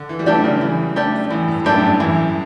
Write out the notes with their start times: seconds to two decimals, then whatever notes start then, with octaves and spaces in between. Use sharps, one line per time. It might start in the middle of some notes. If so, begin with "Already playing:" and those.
Already playing: D3
0.09 E3
0.19 G3
0.26 F#3 A3 D4 G4 D5
0.44 C#3
0.61 E3
0.96 A3 D4 G4 D5
1.30 A2 E3
1.48 G2
1.65 F#2 A3 D4 G4 D5
1.77 A2
1.83 G2
2.00 G2 E3